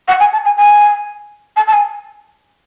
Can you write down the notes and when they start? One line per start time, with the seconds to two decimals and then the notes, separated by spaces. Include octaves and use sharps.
0.08 F#5
0.20 G#5
0.33 A5
0.45 G#5
0.57 G#5
1.57 A5
1.67 A5
1.73 G#5